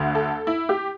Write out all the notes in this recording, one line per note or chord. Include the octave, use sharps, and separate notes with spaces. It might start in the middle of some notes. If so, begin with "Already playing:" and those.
Already playing: D2 D3
A4
E4
G4